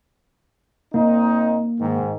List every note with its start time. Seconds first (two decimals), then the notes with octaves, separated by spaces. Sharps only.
0.94 A#2 A#3 C4 D#4
1.80 G#2 D#3